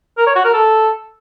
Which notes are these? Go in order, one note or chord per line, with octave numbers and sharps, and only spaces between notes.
A#4
C#5
F#4
A#4
A4